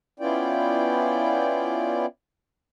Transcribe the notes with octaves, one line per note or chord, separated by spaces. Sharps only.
B3 C#4 E4 F4 D5 G5